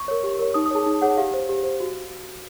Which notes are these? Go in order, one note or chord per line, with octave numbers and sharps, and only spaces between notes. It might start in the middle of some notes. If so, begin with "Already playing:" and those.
Already playing: C#6
A#4 C#5
G4
A#4 C#5
D#4 D#6
D#6
G#4 C#5 A5
D#4
G#4 C#5 F#5
G4 F5
C5
G4
C5
F#4